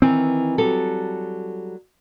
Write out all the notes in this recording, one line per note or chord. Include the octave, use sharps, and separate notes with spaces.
D#3 E3 C4
F#3 G3 A4